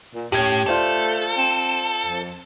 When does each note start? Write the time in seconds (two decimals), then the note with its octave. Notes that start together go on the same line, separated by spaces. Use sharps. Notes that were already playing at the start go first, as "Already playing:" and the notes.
0.15 A#2
0.32 A2 C#4 G4 G#6
0.66 A3 F4 A4 C5 D5
1.37 C4
2.07 F2